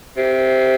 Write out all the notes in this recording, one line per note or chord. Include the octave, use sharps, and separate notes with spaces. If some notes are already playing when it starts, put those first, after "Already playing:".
C3